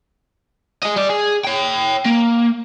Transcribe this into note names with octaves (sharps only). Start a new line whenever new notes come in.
G#4 D#5
G3 D5
G#4
C#5 G5
A#3